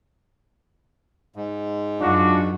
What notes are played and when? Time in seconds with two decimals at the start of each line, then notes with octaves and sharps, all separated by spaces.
1.36 G#2
2.00 F#2 D4 F4 F#4